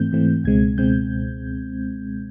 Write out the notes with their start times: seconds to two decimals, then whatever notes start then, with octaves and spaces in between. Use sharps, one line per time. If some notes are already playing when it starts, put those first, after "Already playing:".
Already playing: G#2 E3 A3 C4 G6
0.12 G#2 E3 A3 C4
0.44 C#2 B2 G#3 C4 G#6
0.78 C#2 B2 G#3 C4 G6